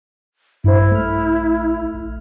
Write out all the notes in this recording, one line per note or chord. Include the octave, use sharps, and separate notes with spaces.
A#1 G2 E4 C5
A3 F6
A#1